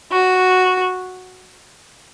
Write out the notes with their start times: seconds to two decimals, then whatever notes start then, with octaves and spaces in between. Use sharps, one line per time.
0.11 F#4